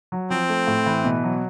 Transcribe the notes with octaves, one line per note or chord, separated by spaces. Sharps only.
F#3
F3 C4
A3
A2
E3
B2
F#3